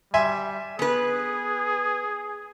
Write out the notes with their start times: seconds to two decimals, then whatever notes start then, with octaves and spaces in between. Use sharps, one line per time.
0.14 G3 E5 G#5 C6
0.79 B3 G#4 B4